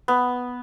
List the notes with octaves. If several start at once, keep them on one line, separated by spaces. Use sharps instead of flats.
B3